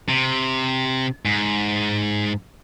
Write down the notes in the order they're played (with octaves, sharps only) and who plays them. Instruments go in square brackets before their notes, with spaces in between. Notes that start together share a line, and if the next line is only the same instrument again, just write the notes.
[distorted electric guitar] C3
G#2